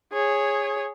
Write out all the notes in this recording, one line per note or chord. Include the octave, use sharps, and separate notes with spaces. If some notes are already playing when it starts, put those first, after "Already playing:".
G#4 C#5